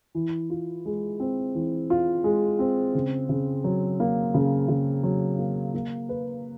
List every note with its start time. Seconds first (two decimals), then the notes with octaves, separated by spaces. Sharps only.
0.15 E3
0.50 F4
0.86 G#3
1.20 C4
1.55 E3
1.90 F4
2.24 G#3
2.59 C4
2.95 C#3
3.29 C#3
3.64 F#3
4.00 A#3
4.34 C#3
4.68 C#3
5.03 F#3
5.39 A#3
5.74 A#3
6.09 B4